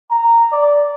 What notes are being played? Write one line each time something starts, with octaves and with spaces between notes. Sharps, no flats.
A#5
D5